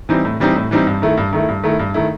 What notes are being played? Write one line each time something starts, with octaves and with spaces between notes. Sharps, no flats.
E3 G3 C4 D#4
A2
E3 G3 C4 D#4
A2
E3 G3 C4 D#4
G2
D#3 A3 E4
G2
D#3 A3 E4
G2
D#3 A3 E4
G2
D#3 A3 E4